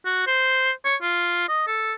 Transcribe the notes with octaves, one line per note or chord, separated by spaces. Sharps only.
F#4
C5
C#5
F4
D#5
A4